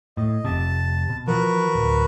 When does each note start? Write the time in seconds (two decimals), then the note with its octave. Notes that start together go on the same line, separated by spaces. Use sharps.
0.17 A2 D#5
0.45 F1 C3 A5
1.10 B2
1.27 E3 F3 F#4 A#4 B4
1.75 D1